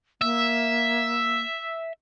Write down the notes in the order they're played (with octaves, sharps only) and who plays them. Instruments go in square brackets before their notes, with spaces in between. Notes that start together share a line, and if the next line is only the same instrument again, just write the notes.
[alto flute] A#3 [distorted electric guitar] E5